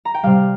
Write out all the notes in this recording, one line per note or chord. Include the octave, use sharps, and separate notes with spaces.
A#5
G5
C3 G3 F5